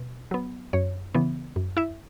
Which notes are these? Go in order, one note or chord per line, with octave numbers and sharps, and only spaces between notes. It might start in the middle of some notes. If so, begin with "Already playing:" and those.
Already playing: B2
F#3 B3
F#2 C#5
C#3 E3 B3
F#2
E4 E5